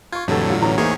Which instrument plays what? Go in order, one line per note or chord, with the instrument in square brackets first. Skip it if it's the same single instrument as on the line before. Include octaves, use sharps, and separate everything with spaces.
[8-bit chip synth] F4 [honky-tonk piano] C#6 G#6
[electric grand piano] F2 A4 [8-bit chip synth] A2 D3 F#3 [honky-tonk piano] E3 G3
[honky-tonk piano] G2 F4
[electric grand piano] A1 C#4 [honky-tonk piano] E3 A#5
[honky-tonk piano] E2 A2 [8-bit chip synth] E3 G#4 C#5 [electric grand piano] A#3 D#4 C5